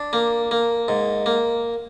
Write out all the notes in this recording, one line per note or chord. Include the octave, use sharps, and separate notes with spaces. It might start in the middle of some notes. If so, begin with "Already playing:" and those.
Already playing: D4
A#3
A#3
G#2
A#3